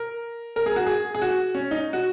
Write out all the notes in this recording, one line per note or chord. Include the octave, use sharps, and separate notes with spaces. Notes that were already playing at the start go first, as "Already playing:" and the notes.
Already playing: A#4
A#4
G#4
F#4
G#4
G#4
F#4
C#4
D#4
F#4